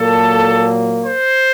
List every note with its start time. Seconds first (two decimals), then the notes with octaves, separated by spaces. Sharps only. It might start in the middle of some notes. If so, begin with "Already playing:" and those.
Already playing: A#2 F#3 A#3 A4
1.04 C5